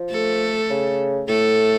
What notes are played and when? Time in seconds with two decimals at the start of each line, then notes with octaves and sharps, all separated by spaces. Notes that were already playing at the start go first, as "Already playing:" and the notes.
Already playing: F3
0.11 A3 A4
0.70 C#3
1.28 A2 A3 A4